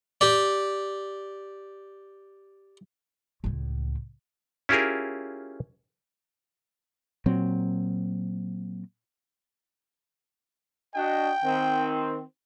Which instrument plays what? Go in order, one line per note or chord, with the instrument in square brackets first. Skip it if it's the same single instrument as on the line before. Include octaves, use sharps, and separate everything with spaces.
[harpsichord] G4 D5
[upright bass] C#2 A2
[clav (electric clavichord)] C#4 E4 F4 G4 G#4 A#4
[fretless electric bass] A#2 F#3 C4
[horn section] D4 F#4 D#5 [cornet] G5
[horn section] D#3 C4